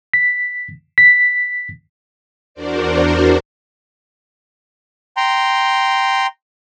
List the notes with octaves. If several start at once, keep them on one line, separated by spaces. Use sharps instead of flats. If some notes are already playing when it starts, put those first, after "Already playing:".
B6
B6
E2 D4 F#4 A#4 C5 D5
G5 A#5 C6